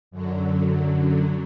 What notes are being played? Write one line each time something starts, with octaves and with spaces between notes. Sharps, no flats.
F#2 D3 F#3